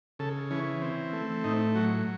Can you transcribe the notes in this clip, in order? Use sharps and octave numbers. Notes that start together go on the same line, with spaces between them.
C#3 A4
E3 C#4
C4
A3
A2 D#4
F#3 F#4